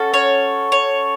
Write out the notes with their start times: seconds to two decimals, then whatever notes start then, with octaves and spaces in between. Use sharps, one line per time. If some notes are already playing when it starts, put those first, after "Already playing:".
Already playing: C#4 F#4 A4
0.14 C#5
0.72 C#5